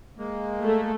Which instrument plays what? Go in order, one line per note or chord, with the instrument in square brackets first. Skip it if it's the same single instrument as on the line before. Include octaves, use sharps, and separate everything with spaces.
[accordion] G#3 A#3
[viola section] A3